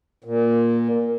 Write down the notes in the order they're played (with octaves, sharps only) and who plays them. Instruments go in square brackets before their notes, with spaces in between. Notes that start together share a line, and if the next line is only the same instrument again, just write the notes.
[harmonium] A#2